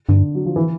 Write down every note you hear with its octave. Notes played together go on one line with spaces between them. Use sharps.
G2 D3
F#3
F3
E3